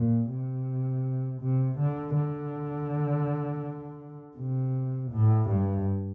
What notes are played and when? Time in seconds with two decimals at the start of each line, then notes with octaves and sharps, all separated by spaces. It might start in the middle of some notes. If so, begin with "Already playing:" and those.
Already playing: A#2
0.29 C3
1.41 C3
1.78 D3
2.15 D3
4.37 C3
5.11 A2
5.48 G2